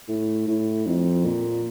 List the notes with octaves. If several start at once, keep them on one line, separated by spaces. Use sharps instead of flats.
A2
A2
F2
A#2